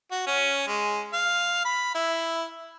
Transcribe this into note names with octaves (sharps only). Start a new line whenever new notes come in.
F#4
C#4
G#3
F5
B5
E4